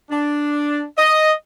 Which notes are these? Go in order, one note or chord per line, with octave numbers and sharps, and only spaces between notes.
D4
D#5